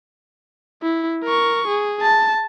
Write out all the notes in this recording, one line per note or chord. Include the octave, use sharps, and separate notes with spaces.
E4
A#4 C#6
G#4
A5